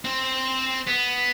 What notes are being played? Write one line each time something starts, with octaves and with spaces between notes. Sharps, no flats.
C4
B3